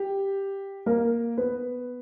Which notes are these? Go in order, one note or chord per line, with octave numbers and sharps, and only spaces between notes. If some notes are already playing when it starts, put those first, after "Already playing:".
Already playing: G4
A#3 A#4
B3 B4